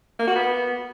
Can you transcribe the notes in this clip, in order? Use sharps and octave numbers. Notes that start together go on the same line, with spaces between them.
A#3
F#4
B3